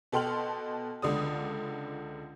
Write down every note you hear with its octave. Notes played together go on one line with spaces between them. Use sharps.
B2 A4 G5 C6 F6 F#7
C#2 D3 D5 D#6